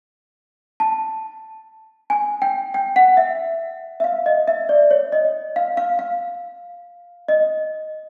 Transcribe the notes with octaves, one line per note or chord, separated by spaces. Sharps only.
A5
G#5
G5
G5
F#5
E5
E5
F5
D#5
E5
D5
C#5
D#5
F5
F5
F5
D#5